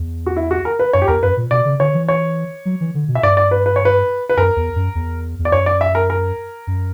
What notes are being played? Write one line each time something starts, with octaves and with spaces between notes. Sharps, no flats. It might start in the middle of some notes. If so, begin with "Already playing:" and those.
Already playing: E2
F#4
E4
F#4
A#4
B4
F#2 C#5
G4
E2 A#4
F#2 B4
A#2
B2 D5
C#3
D3 C#5
E3
C#5
F#3
E3
D3
B2
E5
G2 D5
D5
B4
B4
C#5
B4
B4
F#2 A#4
E2
F#2
E2
E2
D5
F#2 C#5
D5
E5
A#4
A#4
F#2